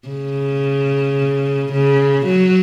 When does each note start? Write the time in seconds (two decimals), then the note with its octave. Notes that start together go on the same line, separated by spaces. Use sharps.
0.08 C#3
1.73 C#3
2.26 F#3